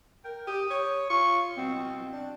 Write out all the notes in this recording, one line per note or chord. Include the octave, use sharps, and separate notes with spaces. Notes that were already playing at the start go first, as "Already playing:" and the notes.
A#4 G5
G4 D#6
C#5
F4 C#6
B2 C4
D4